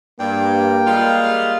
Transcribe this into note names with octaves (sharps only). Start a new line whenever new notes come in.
G2 A#3 G5
G3 G#3 F4